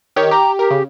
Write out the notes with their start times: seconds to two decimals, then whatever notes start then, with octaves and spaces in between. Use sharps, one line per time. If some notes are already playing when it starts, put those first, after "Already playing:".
0.16 D#3 G4 C#5
0.31 G4 A#5
0.59 G4 A#4
0.71 C#3